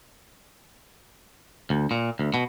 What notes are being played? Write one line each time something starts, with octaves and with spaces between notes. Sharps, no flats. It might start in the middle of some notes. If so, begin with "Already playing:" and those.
D2
A#2
D2
B2